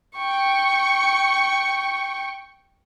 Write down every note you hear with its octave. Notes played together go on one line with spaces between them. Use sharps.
G5 C#6